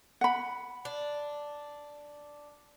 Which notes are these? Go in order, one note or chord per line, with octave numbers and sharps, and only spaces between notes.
F#5 B5
D4